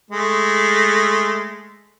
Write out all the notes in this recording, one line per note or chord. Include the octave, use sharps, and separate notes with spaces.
G#3 A3